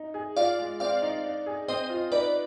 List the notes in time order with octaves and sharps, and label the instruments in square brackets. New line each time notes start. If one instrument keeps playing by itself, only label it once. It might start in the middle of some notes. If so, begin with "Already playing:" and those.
Already playing: [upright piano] D#4
G#4
[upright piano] F4 [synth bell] D5 F5
[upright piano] G#3
[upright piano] C4 [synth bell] D5 F5
[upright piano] D#4
D4
G#4
[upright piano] C4 [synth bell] C5 D#5
[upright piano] F4
[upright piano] D#4 [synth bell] B4 D5